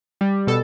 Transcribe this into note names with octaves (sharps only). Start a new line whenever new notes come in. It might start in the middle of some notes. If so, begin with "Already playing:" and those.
G3
B2 A4